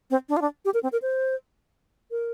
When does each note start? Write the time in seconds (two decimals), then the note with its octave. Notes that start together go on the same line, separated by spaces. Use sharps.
0.10 C4
0.29 D4
0.37 F4
0.41 D4
0.65 G4
0.74 A#4
0.83 C4
0.92 A#4
1.02 C5
2.11 A#4